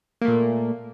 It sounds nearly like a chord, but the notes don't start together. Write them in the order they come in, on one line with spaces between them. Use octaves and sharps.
A#3 A3 A#2